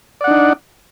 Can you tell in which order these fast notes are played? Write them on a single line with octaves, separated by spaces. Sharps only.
D5 F#5 D4 D#4